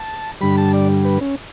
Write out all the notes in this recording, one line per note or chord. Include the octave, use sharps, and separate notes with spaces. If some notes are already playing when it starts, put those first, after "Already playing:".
Already playing: A5
G2 D3 G3 B5
A5
D5
B4
C#4